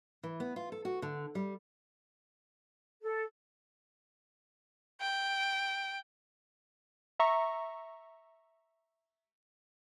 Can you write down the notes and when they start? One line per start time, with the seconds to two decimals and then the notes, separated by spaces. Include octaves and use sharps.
0.23 E3
0.40 B3
0.56 F4
0.72 A4
0.85 F#4
1.02 D3
1.35 G3
3.02 A4
5.00 G5
7.20 E5 A#5 C#6